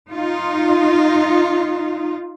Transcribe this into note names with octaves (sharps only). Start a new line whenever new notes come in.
D#4 F4